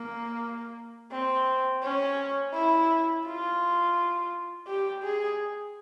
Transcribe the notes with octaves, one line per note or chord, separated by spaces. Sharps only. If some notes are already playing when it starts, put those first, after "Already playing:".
Already playing: A#3
C4
C#4
E4
F4
G4
G#4